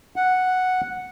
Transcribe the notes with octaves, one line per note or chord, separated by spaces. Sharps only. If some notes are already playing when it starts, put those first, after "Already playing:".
F#5